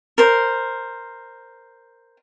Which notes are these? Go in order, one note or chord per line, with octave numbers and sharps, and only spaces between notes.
A#4 C5